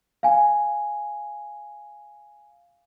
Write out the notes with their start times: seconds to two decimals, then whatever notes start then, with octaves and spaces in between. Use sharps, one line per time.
0.23 F5 G#5